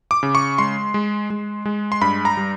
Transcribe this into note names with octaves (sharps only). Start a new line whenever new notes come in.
D6
C#3
C#6
G#3 C6
G#3
G#3
G#3
C6
G2 B5
A#5
G3